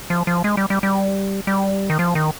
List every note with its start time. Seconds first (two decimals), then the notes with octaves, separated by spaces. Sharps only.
0.10 F3
0.27 F3
0.44 G#3
0.57 G3
0.70 G3
0.83 G3
1.47 G3
1.90 D#3
1.99 F3
2.15 D#3